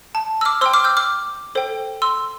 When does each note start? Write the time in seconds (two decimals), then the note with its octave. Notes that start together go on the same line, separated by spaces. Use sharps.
0.15 A5
0.41 E6
0.45 D6 F6
0.61 C5 G5 C6 E6
0.73 D6 F6
0.84 E6 G6
0.97 D6 F6
1.55 A4 C5 G5
2.02 C6 E6